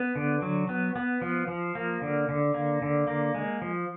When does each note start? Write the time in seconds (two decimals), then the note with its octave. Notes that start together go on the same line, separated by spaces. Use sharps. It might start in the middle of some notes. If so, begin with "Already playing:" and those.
Already playing: B3
0.16 D3
0.42 F#3
0.69 B3
0.96 B3
1.22 F3
1.48 F3
1.75 A#3
2.02 D3
2.29 D3
2.54 A#3
2.82 D3
3.08 A#3
3.35 G#3
3.62 F3